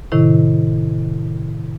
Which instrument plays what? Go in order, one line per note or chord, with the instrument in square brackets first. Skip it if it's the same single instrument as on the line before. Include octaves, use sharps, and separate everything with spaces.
[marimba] A2 C3 D#3 E4